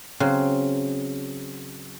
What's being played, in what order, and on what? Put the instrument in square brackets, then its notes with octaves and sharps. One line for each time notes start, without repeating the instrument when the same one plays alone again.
[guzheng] C#3 F#3 C4